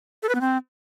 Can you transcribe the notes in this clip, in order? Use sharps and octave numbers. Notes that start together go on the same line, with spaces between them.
A4
B4
B3
C4